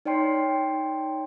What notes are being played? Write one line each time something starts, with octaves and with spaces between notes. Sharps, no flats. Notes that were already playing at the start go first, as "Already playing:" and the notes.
D#4 C#5 D5 G5 C6 C7